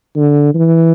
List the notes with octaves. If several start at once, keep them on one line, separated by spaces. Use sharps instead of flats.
D3
E3